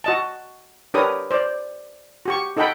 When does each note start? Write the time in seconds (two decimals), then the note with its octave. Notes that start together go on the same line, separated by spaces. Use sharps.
0.04 F#4 D#5 A5
0.94 D4 G4 A#4 B4 C#5 D#6
1.31 C5 D5
2.26 F#4 G4 C#6
2.57 D#4 A4 D#5 F#5 G5 B5